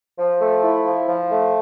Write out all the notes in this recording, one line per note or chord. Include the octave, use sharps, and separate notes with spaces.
F3
A3
E4
F3
F3
A3